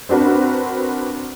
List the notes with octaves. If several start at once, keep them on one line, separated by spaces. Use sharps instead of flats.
C4 D4 F#4 A#4 B4